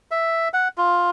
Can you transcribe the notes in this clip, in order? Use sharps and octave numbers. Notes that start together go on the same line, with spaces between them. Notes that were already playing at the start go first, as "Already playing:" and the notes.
E5
F#5
F4